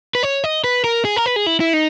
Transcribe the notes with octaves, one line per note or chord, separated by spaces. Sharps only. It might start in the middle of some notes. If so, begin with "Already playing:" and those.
B4
C#5
D#5
B4
A#4
G#4
A#4
B4
G#4
E4
E4
D#4